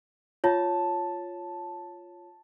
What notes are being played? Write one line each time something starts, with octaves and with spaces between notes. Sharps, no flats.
F4 C#5 A5